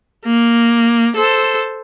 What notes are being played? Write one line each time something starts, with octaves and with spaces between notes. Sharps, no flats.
A#3
A4 C5